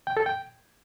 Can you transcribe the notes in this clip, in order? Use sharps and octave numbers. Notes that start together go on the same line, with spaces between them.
G5
A4
G5